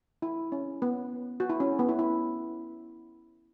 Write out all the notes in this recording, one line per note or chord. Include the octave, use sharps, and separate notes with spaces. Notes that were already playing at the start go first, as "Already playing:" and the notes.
E4
C#4
B3
F#4
E4
C#4
B3
E4
E4